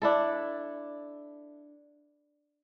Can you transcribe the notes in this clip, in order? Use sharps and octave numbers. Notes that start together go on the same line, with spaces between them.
D4 E4 A4